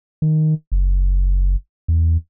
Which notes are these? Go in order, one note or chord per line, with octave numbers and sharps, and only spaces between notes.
D#3
F#1
E2